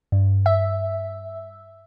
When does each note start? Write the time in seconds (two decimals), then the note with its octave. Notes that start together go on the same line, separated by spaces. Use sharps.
0.12 G2
0.46 E5